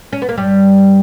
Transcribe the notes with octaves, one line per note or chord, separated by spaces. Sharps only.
C#4
B3
A#3
G2 G3